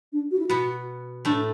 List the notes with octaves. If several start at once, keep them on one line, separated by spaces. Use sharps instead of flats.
D4
F#4
E4
B2 B3 F#4
A2 A3 D4